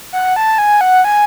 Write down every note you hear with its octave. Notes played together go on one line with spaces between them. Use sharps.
F#5
A5
G#5
F#5
G#5